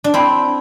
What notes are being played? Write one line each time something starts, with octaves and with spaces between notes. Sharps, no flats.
D4
C4 E4